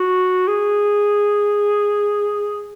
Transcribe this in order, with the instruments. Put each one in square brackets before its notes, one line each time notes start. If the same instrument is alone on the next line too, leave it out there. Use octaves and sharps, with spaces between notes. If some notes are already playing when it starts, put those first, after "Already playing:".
Already playing: [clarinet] F#4
G#4